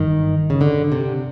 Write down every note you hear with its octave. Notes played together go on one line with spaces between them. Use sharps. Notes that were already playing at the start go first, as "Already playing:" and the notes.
Already playing: G1 G2 D#3 E3
C#3
D3
C3